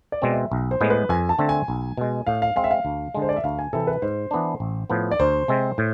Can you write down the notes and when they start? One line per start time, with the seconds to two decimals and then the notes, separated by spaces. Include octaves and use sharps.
0.12 D5
0.22 B2 G#3 C4
0.32 E5
0.52 B1
0.71 C5
0.81 A2 G#3 B3
0.90 B4
1.09 F2 G#5
1.29 A5
1.39 D3 A3 C4
1.49 G#5
1.68 B1
1.98 B2 G#3
2.27 A2 F5
2.42 F5
2.56 G#3 C4 F5
2.64 E5
2.71 F5
2.85 D2
3.14 D3 G#3
3.22 C5
3.29 D5
3.36 E5
3.44 D2 F5
3.59 G#5
3.73 C3 E3 A4
3.87 B4
4.02 G#2 C5
4.31 E3 B3 D4
4.60 A1
4.90 A2 F3 B3
5.11 D5
5.20 D2 C5
5.48 C3 G#3 C4
5.78 A2